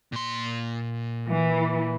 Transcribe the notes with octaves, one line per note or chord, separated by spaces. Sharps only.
A#2 C6
E3